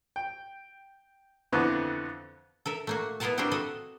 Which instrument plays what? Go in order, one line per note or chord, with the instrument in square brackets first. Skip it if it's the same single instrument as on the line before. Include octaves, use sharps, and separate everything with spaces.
[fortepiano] G5
F2 D3 E3 B3 C#6
[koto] A4 A#4 E5
A3 A#3 F#4
B3 E4 F4 A#4 F#5 A5
G3 A#3 C4 D4 F#4 G4
F#4 A4 D#5